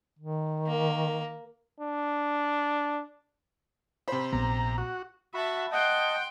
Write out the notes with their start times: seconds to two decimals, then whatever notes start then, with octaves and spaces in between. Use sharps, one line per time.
0.19 D#3
0.67 A#3
1.80 D4
4.08 C3 C5 B5
4.33 A#1 B3 A#5
4.78 F#4
5.34 F#4 E5 F#5 A5 B5
5.72 D#5 F#5 G5 A5 C6